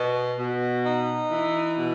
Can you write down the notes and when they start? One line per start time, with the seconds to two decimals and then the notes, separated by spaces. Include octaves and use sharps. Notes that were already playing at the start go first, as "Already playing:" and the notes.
Already playing: B2
0.38 B2
0.85 D#4
1.31 E3
1.77 B2